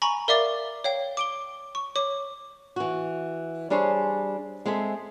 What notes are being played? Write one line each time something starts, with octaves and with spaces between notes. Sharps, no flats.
G#5 A#5 B5 C#6
A#4 D5 E5 F5 D6 A6
C#5 F5 G5
D6 D7 G7
C#6
C#5 D6
E3 F#4
G3 D4 G#4 C5 C#5
G#3 C4 G#4 A4 E5